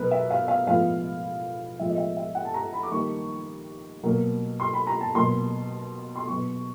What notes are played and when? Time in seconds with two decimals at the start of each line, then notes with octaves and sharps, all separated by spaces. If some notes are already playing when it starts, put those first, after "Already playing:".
Already playing: B2 F#3 B3 A#4 B4
0.11 E5
0.31 F5
0.48 F5
0.67 A2 F3 G#3 B3 F5
1.79 A2 F3 G#3 B3 E5
1.90 D#5
1.98 E5
2.17 E5
2.35 F#5
2.45 A5
2.54 A#5
2.73 B5
2.83 D6
2.91 D#3 G3 A#3 C#6
4.03 B2 F#3 A#3
4.60 C6
4.73 B5
4.87 A#5
5.01 A5
5.15 B2 F#3 A#3 C6
6.16 C6
6.27 B2 F#3 B3 C#6